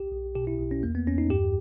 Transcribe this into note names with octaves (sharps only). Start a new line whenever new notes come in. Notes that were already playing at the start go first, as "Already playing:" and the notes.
Already playing: B1 G4
B1
B2 G4
E4
B1
C#4
E2 A#3
B3
E2 C#4
D#4
G2 G4